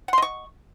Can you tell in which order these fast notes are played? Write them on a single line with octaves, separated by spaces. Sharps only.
F#5 C6 D#5 C#6